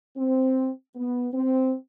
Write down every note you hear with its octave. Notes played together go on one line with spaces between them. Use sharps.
C4
B3
C4